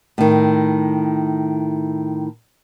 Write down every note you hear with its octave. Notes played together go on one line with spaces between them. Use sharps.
A2 D#3